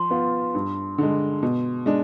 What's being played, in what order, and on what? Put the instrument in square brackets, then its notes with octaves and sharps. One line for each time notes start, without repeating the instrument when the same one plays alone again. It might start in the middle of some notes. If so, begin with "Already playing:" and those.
Already playing: [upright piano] F3 [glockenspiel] C6
[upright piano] B3 F4
G2
D3 G#3
B2
G#3 D4